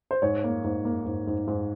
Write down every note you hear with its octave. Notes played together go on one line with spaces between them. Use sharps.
C5
G#2 C#5
A#3
G#2
A#3
G#2
G#2
G#2